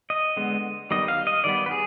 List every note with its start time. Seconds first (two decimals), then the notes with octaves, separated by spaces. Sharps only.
0.10 D#5
0.37 D3 G#3 B3
0.91 D#3 G3 B3 D#5
1.08 F5
1.27 D#5
1.44 D#3 G3 B3 D5
1.66 B4
1.71 G#4